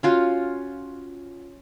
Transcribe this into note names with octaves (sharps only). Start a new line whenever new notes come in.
C#4 F4 F#4